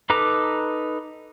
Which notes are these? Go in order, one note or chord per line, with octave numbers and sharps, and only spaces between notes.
D#4 A4 B4 A#5 D6